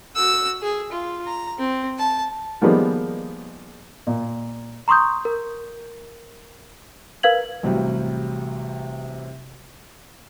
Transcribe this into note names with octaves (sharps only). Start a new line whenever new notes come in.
F#4 E6
G#4
F4
A#5
C4
A5
D#3 F3 G3 G#3 A#3 B3
A#2
A#5 C6 C#6 D#6 G6
A#4
A#4 B4 F5 G#6 F#7
A1 C3 F#3 G3